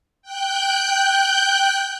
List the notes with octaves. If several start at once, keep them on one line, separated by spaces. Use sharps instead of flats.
G5 F#6 G6